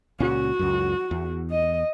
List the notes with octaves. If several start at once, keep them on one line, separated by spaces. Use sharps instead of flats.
C#2 A#2 C#4 F#4
C#2 F#2
E2
D#5